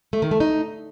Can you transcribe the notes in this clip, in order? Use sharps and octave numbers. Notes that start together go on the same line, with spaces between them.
A3
D#3
A3
D#4